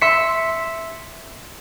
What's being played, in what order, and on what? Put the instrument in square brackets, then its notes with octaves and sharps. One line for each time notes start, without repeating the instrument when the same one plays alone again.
[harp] E5 C6 B6 C#7